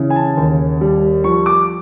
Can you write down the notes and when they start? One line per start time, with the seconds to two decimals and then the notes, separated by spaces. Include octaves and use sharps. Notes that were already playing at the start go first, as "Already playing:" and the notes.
Already playing: C#3 E3
0.10 G#5
0.16 A5
0.37 D#2
0.81 G3
1.24 F3 C#6
1.46 D6